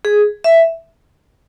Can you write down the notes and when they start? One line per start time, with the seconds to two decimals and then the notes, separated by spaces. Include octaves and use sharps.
0.05 G#4
0.44 E5